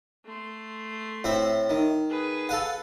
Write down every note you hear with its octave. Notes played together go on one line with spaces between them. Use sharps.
A3 C6
A2 C4 E5
D#3
G#4 B4
A4 F5 F#5